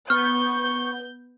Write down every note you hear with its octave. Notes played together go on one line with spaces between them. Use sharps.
B3 C#6 F6 G6